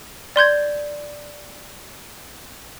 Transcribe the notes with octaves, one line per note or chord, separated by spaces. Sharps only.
D5 C6 G6 G#6